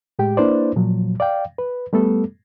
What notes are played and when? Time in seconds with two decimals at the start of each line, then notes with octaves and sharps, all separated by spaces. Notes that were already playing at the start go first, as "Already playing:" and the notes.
0.19 A2 G#3 G4 G5
0.37 A#3 D4 E4 B4 C5 D5
0.76 A#2 F3 F#3
1.20 D5 F5 G5
1.59 B4
1.93 G3 A3 B3 A4